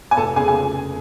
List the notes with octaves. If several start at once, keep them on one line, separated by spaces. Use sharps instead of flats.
G#5
F1 A4 A5
C#3 G#4 G#5
G#5